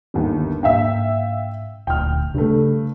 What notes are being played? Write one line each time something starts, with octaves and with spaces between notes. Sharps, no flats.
G1 D#2
G#2 A#3 D4 E5 F5 G5
D#1 D2 G5 F6
G2 C#3 A3